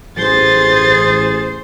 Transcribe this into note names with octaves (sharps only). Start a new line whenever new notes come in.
A1 G#4 C5 A6